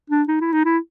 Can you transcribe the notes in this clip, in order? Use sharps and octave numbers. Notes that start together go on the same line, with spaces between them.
D4
D#4
E4
D#4
E4